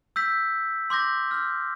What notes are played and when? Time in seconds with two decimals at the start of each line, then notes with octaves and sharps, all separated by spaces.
0.16 E6 G6 B6
0.90 C6 D6 G6 A#6
1.31 F6 G6